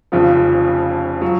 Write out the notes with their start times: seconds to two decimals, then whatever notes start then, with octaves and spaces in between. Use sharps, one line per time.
0.12 F1 F2 C#3 F3 F4
1.21 F#3 F4